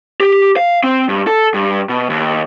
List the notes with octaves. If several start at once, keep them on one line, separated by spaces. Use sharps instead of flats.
G4
F5
C4
G2
A4
G2
B2
D#2